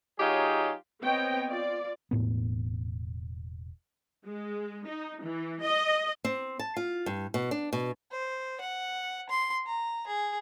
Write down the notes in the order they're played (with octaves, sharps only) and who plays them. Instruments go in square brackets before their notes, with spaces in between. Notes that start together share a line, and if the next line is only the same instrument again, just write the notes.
[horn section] F#3 D#4 F4 G4 G#4 C#5
[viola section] B3 C4 C#5 D#5 G5
F4 D5
[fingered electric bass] E1 A2 B3
[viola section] G#3
D#4
E3
D#5
[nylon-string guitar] C4
A5
F4
G2
B2
D4
B2
[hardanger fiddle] C5
F#5
C6
A#5
G#4